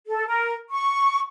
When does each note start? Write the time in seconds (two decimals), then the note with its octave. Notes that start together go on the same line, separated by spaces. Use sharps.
0.06 A4
0.27 A#4
0.70 C#6